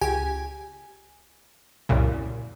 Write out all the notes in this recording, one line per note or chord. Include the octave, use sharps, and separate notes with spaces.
C#2 G4 G#5
C2 F#2 A#2 C#3